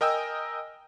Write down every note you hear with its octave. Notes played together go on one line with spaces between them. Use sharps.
A#4 D#5 G5 G#5 E6